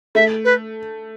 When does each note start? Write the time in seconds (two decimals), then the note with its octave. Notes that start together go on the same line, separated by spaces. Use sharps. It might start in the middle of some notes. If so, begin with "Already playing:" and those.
0.15 A3 E5
0.45 B4